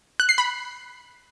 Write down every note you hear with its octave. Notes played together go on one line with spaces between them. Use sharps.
F#6
C7
B5